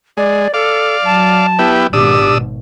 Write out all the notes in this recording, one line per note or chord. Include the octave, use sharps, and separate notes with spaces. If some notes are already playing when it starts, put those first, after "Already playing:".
G#3 D5
A4 D5 F5
F#3 A5
B3 E4 G4
G#1 B2 D4 G4 D#6 E6